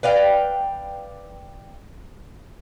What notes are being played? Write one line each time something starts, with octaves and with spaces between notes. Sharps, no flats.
B4 D5 F5 G5